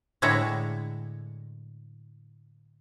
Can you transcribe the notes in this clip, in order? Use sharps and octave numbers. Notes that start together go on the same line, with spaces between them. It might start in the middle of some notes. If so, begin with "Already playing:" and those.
A2 D3 G#3 E4 C#5 A#5